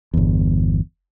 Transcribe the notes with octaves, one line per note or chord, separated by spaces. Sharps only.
G1 E2